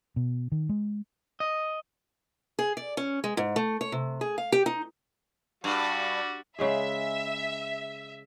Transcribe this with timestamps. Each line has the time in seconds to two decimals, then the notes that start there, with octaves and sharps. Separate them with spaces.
0.16 B2
0.52 D#3
0.69 G#3
1.40 D#5
2.59 G#4
2.77 D5
2.97 C#4
3.24 G#3
3.37 G#2
3.56 A3
3.81 C#5
3.92 C3
4.21 G#4
4.38 F5
4.52 G4
4.66 D#4
5.64 G2 G3 F#4
6.59 C#3 G#3 G#4 E5